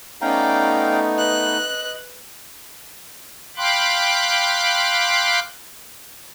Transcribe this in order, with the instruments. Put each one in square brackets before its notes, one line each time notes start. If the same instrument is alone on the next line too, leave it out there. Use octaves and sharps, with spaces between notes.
[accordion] A3 B3 D#4 [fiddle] C#4 D5 [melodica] F5 G5 A#5
[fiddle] B4 F#6 [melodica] D#5
[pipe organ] F5 G5 B5 C6 D6 F#6